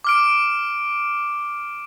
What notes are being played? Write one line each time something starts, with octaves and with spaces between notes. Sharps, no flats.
D6 F6 D7